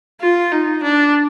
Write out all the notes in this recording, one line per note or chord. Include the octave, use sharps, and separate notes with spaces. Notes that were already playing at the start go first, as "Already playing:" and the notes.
F4
D#4
D4